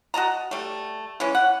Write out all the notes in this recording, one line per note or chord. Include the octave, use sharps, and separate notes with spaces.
F#4 D#5 A5 A#5
G3 A3
E3 G#3 C#4
F#5